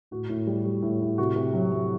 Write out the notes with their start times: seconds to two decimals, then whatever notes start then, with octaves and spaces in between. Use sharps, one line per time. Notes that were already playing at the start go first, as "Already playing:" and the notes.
0.11 A2 F#4
0.29 A2
0.47 G3
0.66 G3
0.82 A2
1.01 A2
1.18 C3 F#4
1.36 C3
1.54 F#3
1.72 F#3